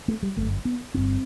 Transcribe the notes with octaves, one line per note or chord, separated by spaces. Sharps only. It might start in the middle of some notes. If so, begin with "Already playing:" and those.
A3
G3
G1 F#2 A3
B3
G1 G2 C4